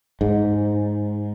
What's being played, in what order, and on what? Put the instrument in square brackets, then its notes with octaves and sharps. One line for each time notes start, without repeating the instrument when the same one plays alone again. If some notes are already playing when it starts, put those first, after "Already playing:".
[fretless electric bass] G#2